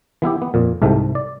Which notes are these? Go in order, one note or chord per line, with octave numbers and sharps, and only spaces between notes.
E3 B3 E4 G4
B3
F2 A#2
C2 G#2 C3 A3
D5